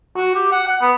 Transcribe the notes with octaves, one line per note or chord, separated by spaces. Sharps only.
F#4
G4
F#5
F#5
B3